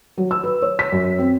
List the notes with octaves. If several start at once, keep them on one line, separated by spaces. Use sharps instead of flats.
F#3
E6
B4
C#5
B6
F#2
C4